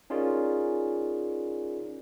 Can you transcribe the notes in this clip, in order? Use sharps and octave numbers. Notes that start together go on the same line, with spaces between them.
C#4 D#4 F4 G#4 A#4 D5